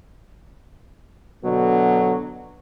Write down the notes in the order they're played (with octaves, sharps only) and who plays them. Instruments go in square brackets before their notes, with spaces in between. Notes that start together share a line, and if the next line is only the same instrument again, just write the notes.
[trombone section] B2 D3 F#3